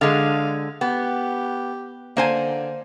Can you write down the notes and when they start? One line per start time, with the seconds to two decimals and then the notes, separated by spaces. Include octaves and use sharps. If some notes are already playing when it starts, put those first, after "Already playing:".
0.01 D3 G#3 F5
0.81 B3 G4
2.17 D3 A#3 C5 G#5